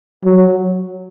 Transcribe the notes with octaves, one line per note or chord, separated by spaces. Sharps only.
F#3